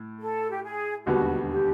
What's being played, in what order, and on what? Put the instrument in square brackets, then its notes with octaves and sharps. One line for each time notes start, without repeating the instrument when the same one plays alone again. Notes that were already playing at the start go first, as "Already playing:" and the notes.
Already playing: [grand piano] A2
[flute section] A4
G4
G#4
[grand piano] E1 D#2 D3 G3 B3 [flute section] F#4
[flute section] G4